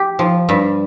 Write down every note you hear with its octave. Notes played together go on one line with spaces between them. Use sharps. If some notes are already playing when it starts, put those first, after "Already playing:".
Already playing: G4
F3
G2